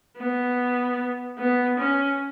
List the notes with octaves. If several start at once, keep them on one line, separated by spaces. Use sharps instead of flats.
B3
B3
C#4